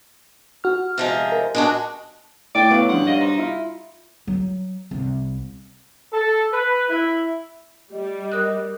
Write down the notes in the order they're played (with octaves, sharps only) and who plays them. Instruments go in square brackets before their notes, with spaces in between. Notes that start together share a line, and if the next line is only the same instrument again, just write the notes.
[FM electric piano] F#4 F6
[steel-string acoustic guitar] C3 F3 G#3
[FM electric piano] A#4
[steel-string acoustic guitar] G#3 D4 F#4
[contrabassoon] A2 [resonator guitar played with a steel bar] D5 G5 [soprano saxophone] D6
[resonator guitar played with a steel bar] F#3 [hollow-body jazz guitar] B3 F5
[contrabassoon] G2 [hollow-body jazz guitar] F3 C#4 C6 [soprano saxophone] F#5
[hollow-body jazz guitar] G3 D5 F5 [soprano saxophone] D#5
[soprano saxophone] D#4 [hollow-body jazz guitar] C5
[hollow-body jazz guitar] E4 F4
[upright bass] F#3
C2
[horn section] A4
B4
E4
[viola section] G3 [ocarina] D#5
[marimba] A#4 D#6 F#6